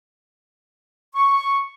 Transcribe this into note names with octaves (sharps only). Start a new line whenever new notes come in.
C#6